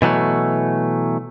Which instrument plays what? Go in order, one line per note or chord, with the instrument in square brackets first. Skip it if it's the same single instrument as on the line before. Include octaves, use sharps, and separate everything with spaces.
[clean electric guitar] B2 E3 F#3 A3